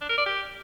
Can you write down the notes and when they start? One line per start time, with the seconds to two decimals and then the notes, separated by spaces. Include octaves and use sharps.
0.01 D4
0.10 A#4
0.18 D5
0.26 G4